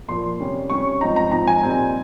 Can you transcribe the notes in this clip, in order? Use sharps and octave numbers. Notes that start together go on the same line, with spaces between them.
A#2 F3 A#3 C6
C3 G3 C#4
C3 G3 C#4 C#6
G#2 F3 C4 D#4 A#5
A#5
G#2 F3 C4 D#4 A#5
G#5
A#2 G3 C4 D#4